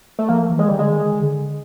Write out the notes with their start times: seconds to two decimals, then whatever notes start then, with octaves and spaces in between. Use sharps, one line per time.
0.19 A3
0.28 F3 A#3
0.49 E3
0.59 G#3
0.68 D#3 G3
0.79 D3 G#3
0.90 D#3
1.21 D3